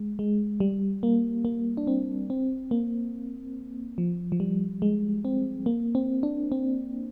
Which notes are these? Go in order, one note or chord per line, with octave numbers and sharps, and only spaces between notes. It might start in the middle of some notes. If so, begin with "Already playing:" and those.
Already playing: G#3
G#3
G3
A#3
A#3
D4
C4
C4
A#3
F3
F3
G3
G#3
C4
A#3
C4
D4
C4